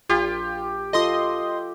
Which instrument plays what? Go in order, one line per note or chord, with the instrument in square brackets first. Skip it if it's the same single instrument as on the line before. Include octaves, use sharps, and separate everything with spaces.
[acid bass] A#1 [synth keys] F4 [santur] G4
[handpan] F4 A4 [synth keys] D#5 C6 D#6